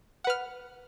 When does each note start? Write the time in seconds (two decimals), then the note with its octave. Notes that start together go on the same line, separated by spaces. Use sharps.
0.24 F#5
0.27 B4
0.30 F6